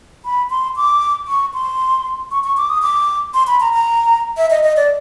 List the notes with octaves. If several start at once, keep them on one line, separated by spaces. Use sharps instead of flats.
B5
C6
D6
C#6
C6
C#6
C#6
D6
D#6
D6
C6
B5
A#5
A#5
E5
D#5
D#5
D5